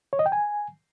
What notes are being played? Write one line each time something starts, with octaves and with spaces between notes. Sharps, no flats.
C#5
D#5
G5
G#5